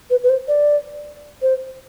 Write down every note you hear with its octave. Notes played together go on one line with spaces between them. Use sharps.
B4
B4
C5
D5
C5